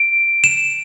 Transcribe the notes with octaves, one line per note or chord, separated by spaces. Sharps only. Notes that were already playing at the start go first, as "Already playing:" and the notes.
Already playing: D7
E7